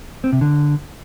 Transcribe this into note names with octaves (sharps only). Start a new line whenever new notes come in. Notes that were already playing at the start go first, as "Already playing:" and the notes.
C4
C3
D3